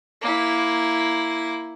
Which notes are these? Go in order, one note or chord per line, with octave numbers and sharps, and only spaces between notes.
A#3 E4